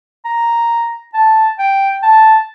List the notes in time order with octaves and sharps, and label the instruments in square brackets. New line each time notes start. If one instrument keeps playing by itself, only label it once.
[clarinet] A#5
A5
G5
A5